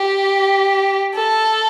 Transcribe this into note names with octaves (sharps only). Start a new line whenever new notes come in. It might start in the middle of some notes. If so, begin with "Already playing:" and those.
Already playing: G4
A4